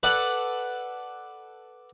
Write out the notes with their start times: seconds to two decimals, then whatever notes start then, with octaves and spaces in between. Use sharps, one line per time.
0.03 A4 B4 D5 F#5